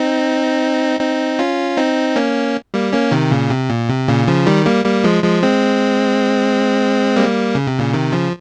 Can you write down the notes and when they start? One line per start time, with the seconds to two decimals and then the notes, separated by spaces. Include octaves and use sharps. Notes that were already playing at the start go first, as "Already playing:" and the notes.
Already playing: C4 D#4
1.00 C4 D#4
1.39 C#4 F4
1.77 C4 D#4
2.16 A#3 C#4
2.74 G3 A#3
2.93 A#3 C#4
3.12 C3 D#3
3.31 A#2 C#3
3.50 C3
3.69 A#2
3.89 C3
4.08 A#2 C#3
4.28 C#3 F3
4.47 D#3 G3
4.66 G3 A#3
4.85 G3 A#3
5.04 F3 G#3
5.24 F3 G#3
5.43 G#3 C4
7.16 G3 A#3
7.55 C#3
7.67 C3
7.79 A#2 C#3
7.93 C3 D#3
8.12 C#3 F3